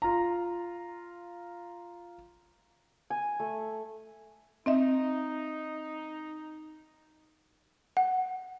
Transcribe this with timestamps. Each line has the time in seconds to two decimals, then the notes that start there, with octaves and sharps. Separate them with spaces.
0.02 F4 A#5
3.10 G#5
3.40 A3
4.66 C4 D#4 D#5 E5
7.97 F#5